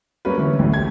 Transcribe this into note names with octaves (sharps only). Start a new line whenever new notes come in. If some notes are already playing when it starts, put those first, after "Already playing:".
F#3 G3 A#3 C#4 A#4 B4
D3 E3 A3 C#4
A1 D2 A2
G4 G#6